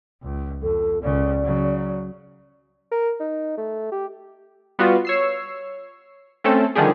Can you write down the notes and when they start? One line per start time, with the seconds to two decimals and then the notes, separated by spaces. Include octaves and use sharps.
0.23 C#2
0.62 F2 A4
1.03 C#2 C#3 D5
1.43 C#3 F#3
2.92 A#4
3.20 D#4
3.58 A3
3.92 G4
4.79 G3 B3 F4 F#4
5.05 C#5 E6 C7
6.44 A3 C4 C#4 A4
6.75 D3 D#3 F3 G3 G4 G#4